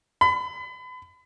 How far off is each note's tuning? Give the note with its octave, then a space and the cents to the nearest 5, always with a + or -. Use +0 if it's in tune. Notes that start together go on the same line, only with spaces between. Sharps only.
B5 +35